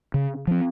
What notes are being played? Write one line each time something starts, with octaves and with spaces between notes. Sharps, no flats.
C#3
F3 C4